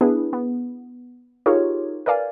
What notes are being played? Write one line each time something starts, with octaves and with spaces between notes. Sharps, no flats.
B3 D4 E4 G#4 B4
B3
D#4 F4 G4 G#4 A#4 C#5
A#4 B4 D5 F5 G#5